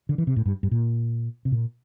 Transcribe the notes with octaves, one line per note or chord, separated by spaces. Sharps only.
D3
E3
C3
A2
G2
G2
A#2
C3
A#2